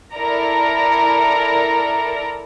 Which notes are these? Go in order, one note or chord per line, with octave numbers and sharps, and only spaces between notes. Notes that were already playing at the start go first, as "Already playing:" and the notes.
E4 A4 A#4 D5 A#5